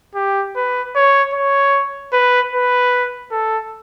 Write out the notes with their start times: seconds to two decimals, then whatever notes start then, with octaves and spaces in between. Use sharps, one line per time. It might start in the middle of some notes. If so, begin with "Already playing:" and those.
0.16 G4
0.56 B4
0.96 C#5
1.34 C#5
2.13 B4
2.53 B4
3.31 A4